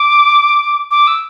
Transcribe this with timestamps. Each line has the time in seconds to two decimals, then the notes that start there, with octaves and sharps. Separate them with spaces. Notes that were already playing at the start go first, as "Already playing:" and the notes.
Already playing: D6
0.91 D6
1.07 E6